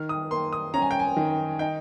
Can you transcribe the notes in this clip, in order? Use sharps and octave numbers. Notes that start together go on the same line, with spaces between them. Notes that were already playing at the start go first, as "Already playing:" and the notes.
Already playing: D#3 F6
D#6
A#3 C6
D#6
C#4 A#5
G#5
G5
G#5
D#3
D#4 G5